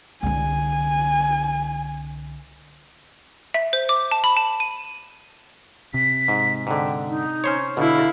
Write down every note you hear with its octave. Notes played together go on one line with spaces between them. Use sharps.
C2 D3 G#5
E5
C5
D6
A5
B5
A5
D#7
C3 B6
G#2
G#2 D3 G5
D#4
C#4 C5 C#5
B2 D3 E4 F5